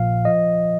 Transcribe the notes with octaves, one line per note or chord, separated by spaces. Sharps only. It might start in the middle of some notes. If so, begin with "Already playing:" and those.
Already playing: A#1 A#2 F3 F5
F3 D#5